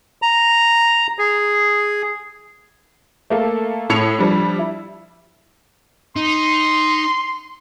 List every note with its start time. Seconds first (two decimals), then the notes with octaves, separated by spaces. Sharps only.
0.22 A#5
1.19 G#4
3.30 A3 A#3 A4
3.90 A2 A4 E6 G#6 C#7 F7
4.19 F3 G3 D4
4.59 E4
6.16 D#4 C6